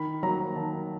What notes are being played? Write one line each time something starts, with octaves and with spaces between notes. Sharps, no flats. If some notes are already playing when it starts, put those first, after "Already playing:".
Already playing: D#3 B5
F#3 A#3 A#5
D#3 A5